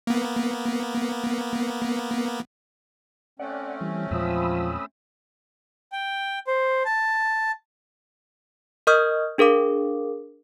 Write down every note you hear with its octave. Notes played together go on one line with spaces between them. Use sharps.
A#3 B3
A3 C4 C#4 D5 F#5
E3 G3
E2 A#2 F3 G#3 B5 D#6 E6
G5
C5
A5
A#4 D#5 C#6 D#6 F6 G6
D4 G#4 A#4 F5 D6